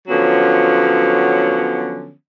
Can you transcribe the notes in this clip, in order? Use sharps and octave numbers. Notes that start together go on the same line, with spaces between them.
D3 F3 F#3 B3 C#4